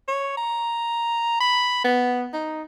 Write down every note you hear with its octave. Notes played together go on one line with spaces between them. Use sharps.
C#5
A#5
B5
B3
D#4